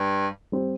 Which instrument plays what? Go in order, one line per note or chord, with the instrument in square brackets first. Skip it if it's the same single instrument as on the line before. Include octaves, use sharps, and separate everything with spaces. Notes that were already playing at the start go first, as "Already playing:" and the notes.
Already playing: [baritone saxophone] G2
[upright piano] G3 C4 G4